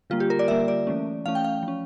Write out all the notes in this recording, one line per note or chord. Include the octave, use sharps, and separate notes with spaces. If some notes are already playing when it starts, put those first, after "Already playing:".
D3 G3 A#3 F4
G4
A#4
D5
D3 G3 A#3 E5
D5
E3 A3 C#4
E3 A3 C#4 F5
G5
F5
F3
C#4